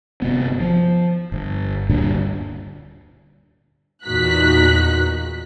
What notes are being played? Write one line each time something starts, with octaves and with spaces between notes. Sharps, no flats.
G1 C3 B3
F3
G1
D2 G2 A#2 D3
E2 A#2 D#4 F#4 F#6 B6